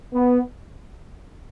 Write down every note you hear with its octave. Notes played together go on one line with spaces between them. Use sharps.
B3